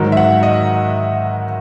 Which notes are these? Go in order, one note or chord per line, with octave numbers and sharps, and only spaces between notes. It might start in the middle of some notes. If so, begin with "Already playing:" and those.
Already playing: G#2 D#3 F#3
E5
F#5
D#5